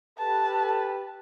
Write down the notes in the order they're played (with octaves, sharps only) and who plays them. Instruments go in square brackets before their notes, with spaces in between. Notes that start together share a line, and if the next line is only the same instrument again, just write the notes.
[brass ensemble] G4 A4 B4 [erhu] A5